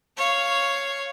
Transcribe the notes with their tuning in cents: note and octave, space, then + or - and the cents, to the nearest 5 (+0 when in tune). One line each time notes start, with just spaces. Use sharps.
C#5 +0 F5 -5